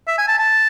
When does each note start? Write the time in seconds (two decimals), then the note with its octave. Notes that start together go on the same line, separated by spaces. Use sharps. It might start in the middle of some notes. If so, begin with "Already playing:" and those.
0.08 E5
0.18 G#5
0.28 A5
0.39 A5